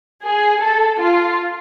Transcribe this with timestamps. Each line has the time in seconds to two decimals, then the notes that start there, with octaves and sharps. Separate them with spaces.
0.24 G#4
0.62 A4
1.00 F4